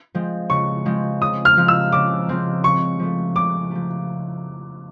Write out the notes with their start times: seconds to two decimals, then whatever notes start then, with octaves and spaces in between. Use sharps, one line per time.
0.14 F3 G#3 C4
0.50 C#3 C#6
0.85 F3 G#3 C4
1.22 C#3 D#6
1.45 F6
1.57 F3 G#3 C4
1.68 E6
1.92 C#3 D6
2.29 F3 G#3 C4
2.63 C#3 C#6
2.99 F3 A3
3.36 C#3 D6
3.71 F3 A3